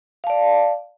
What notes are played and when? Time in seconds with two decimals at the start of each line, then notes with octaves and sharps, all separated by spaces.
0.24 F5
0.27 A5
0.30 D5